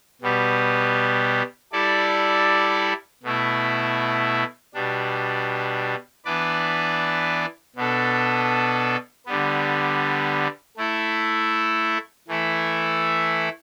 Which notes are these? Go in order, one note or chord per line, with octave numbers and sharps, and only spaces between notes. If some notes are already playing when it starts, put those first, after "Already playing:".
B2 G3 B3 G4
G3 E4 A4 D5
B2 A3 E4
B2 G3 D4
E3 B3 D4 B4 D5
B2 B3 D4 A4
D3 G3 B3
A3 E4 A4
E3 A3 E4 A4